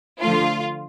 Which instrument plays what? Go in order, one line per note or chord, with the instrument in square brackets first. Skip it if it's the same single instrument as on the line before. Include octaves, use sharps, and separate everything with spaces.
[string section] D3 F3 A3 F4